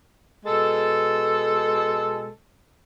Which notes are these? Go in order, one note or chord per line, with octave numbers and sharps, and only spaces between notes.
B2 G#3 A4